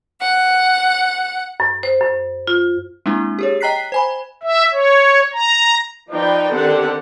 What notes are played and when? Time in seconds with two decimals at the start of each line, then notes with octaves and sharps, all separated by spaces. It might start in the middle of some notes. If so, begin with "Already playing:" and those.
0.21 F#5
1.60 F#2
1.83 C5
2.01 F#2
2.47 F4
3.06 G#3 A#3 C4 D4 E4
3.39 G4 G#4 C#5
3.61 D#5 G5 A#5 F#6 B6 C7
3.92 C5 G#5 B5
4.43 E5
4.72 C#5
5.33 A#5
6.11 F3 D#4 B4 D5 G5
6.52 D3 D#3 C4 G4 A4 F#5